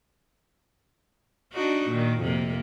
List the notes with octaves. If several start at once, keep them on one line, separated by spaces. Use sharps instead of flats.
D4 D#4 F#4
A#2 D#3
F2 C3 A#3